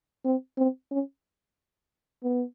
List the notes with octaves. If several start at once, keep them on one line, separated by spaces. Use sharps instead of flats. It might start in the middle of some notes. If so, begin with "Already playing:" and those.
C4
C4
C#4
B3